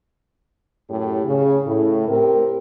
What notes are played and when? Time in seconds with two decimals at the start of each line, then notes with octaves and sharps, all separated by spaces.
0.90 F#2 A2 G4
1.25 C#3
1.66 A2
2.09 C4 G4 A#4